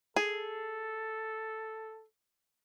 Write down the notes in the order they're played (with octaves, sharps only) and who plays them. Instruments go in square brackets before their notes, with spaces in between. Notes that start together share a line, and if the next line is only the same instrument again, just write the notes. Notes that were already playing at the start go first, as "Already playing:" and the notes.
[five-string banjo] G#4 [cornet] A4